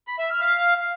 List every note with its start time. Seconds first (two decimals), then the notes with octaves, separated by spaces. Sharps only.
0.08 B5
0.19 E5
0.30 F6
0.41 F5